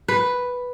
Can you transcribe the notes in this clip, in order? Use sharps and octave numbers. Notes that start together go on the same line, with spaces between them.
B4